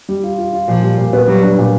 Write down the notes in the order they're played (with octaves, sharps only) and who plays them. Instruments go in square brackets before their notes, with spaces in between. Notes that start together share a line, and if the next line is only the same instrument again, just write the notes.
[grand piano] G3
F4
F4
F4
[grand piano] A#2 [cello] F3
[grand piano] G3
A#2
B3
[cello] F#3 [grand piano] G3
[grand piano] D4
A#2